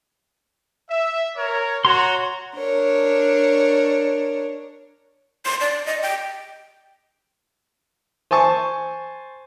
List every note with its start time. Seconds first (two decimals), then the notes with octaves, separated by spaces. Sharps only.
0.90 E5
1.37 A#4 C#5
1.85 F#4 C#5 A#5 C6
2.57 D4 A#4 C#5
5.46 C6
5.61 D5
5.86 D#5
6.02 G5
8.31 C5 G#5 A5 C#6